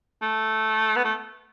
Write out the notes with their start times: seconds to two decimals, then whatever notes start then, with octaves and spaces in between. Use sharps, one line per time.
0.22 A3
0.96 B3
1.05 A3